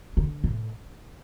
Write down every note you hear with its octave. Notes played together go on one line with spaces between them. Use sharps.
D3
A2